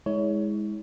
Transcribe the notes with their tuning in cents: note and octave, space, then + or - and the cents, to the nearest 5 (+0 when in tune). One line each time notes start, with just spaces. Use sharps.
G#3 +0 E4 -40 C#5 +20